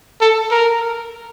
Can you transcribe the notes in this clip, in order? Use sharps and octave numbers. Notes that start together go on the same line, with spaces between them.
A4
A#4